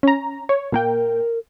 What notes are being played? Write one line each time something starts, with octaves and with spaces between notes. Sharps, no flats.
C#4 A#5
C#5
A#2 A#3 A#4 G5